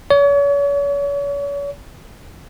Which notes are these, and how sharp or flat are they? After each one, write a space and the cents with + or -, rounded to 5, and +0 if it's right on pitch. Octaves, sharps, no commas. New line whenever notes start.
C#5 +40